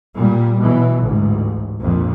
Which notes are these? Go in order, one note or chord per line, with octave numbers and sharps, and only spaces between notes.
A#2 G3
B2 E3 F#3
A1 D2 G#2
A#1 F2 A#2